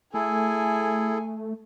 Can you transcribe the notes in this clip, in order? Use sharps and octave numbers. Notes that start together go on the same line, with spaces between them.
A3 E4 G#4 A4 G#5